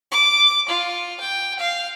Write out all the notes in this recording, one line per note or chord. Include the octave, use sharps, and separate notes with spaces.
D6
F4
G5
F5